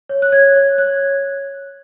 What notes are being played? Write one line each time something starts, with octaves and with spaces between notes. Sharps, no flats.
C#5
F#6
C#5 G#6
C#5
C#5 F#6